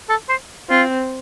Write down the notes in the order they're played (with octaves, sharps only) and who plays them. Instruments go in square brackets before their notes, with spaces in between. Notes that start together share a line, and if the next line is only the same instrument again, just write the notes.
[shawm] A4
C5
[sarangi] C4 [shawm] F4